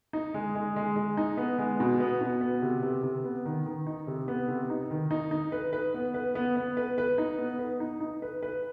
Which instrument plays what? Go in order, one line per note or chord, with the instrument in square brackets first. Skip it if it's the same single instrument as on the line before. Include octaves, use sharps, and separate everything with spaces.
[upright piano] D#4
G#3
G#3
G#3
G#3
D#4
B3
G#3
B2
B3
B2
B3
C3
C3
C3
B3
D#3
D#3
D#4
C3
B3
C3
D#4
D#3
D#4
D#4
B4
B4
B3
B4
B3
B3
B4
B4
D#4
B3
B4
D#4
D#4
B4
B4